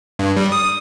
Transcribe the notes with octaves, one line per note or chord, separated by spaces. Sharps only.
G2
G3
D#6